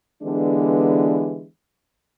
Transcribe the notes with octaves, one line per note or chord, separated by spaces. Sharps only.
D3 E3 G#3 B3 D4 G4